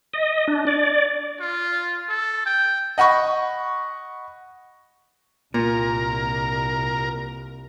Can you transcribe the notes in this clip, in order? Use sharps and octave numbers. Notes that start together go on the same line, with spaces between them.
D#5
D4
D5
F4
A4
G5
D#5 F#5 B5 C#6
C2 A#2 A#4